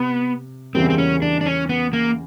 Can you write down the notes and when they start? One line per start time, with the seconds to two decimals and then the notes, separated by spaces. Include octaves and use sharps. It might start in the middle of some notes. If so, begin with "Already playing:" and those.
Already playing: C3 B3
0.74 E2 C#3 E3 G3 A#3 C4
0.90 C4
0.98 C#4
1.22 D4
1.41 D4
1.46 C#4
1.69 B3
1.93 A#3